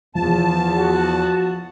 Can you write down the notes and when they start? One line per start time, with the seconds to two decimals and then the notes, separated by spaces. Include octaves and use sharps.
0.15 E2 F3 A5
0.79 F#4